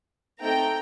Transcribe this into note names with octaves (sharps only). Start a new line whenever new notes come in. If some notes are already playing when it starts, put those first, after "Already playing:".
A3 C4 D#4 A4 G5 A#5